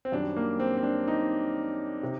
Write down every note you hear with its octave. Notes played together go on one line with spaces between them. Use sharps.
C4
F#2 D#3 G3 D4
A#3
C4
C4
D4
D#4
C3